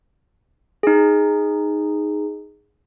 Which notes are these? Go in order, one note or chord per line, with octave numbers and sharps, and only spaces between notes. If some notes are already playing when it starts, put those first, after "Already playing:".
D#4 G#4